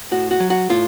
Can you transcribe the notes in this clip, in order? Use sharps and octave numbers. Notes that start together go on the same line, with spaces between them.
A2 F#4
F#4
F#3
F#4
A2 F4